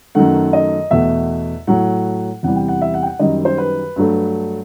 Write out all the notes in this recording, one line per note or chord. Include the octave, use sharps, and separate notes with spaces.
F#2 D#3 A3 F#5
D#5
E2 B2 A3 E5
A2 F#3 A3 F#5
E2 C3 E3 G3 F#5
G5
F#5
E5
F#5
G5
F#5
F#2 D#3 G3 D#5
C5
B4
G2 F#3 A3